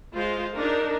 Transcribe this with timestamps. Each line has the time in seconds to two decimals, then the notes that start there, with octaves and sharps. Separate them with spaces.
0.15 G#3 F4 C5
0.57 D4 D#4 A#4